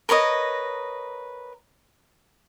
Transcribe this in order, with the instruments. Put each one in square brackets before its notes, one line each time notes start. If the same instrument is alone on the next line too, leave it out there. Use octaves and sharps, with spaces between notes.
[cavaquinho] A#4 B4 C#5 D#5